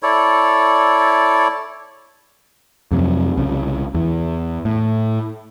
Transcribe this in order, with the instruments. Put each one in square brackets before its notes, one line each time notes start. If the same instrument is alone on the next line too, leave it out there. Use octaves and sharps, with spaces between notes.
[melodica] E4 A4 C#5 D5
[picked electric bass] F2 C3 F#3
C2 C#3
E2
A2